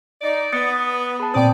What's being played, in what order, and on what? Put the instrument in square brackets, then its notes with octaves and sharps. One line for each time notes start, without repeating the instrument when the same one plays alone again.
[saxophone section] D#4 D5
[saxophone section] B3 [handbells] D#6 A6 C#7
[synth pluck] G#4 [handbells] A5 B5
[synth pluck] A#2 C4 D#6 [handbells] C5 G5 [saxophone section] D5